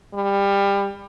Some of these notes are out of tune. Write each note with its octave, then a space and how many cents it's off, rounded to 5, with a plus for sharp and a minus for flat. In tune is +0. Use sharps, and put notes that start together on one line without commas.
G3 +25